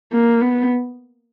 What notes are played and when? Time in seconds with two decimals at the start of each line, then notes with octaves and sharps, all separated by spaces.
0.13 A#3
0.41 B3